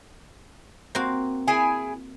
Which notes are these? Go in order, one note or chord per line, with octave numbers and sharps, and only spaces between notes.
A#3 C4 F#4
E4 G#4 G#5